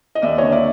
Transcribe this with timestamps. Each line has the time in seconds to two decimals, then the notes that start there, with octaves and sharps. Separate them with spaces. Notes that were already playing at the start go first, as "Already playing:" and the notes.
0.15 D#5
0.22 D#2 D5 E5
0.38 D3 C#5 D#5
0.52 D5 E5